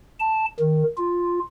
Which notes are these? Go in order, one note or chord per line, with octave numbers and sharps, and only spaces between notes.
A5
D#3
F4